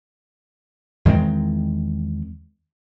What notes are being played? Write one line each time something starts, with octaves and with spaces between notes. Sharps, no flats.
E2 D#3 G#3 C4